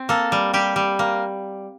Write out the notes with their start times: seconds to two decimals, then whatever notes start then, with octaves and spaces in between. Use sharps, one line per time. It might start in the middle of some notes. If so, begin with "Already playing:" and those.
Already playing: C4
0.09 A#3 A4
0.32 G3
0.54 G3 G4
0.76 G3
0.99 A#3